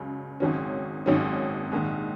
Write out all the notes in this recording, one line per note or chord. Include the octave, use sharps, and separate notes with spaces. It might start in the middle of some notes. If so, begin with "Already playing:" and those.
Already playing: C#2 C#3 F#3
G#1 G#2 D#3 F#3 C#4
G#1 G#2 D#3 F#3 C#4
A#1 G#2 D#3